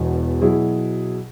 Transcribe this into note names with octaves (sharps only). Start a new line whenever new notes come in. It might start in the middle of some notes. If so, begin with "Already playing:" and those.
Already playing: E1 E2 B2
B2 F#3 E4 G#4